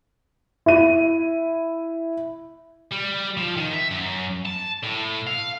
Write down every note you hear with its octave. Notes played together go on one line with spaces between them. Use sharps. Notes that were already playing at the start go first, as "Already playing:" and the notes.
E4 D#7
G3
F3
D#3
E5
F#2
A5
A2
F5